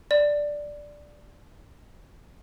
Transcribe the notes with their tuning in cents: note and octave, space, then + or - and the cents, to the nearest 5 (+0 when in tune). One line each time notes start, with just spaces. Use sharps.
D5 +0